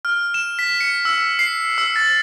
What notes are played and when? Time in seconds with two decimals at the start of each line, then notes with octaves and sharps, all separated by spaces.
0.05 F6
0.34 E7
0.59 B6
0.81 C#7
1.05 E6
1.39 C7
1.78 E6
1.96 A6